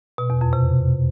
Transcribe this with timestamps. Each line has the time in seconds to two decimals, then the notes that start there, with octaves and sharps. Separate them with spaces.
0.18 B2
0.30 E2
0.41 F2
0.53 C3